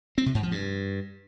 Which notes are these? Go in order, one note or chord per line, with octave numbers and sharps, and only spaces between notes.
C4
C3
G#2
F3
G2